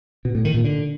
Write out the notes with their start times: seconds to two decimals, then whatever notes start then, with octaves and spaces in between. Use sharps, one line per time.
0.25 B2
0.35 A2
0.45 D#3
0.54 A#2
0.64 D3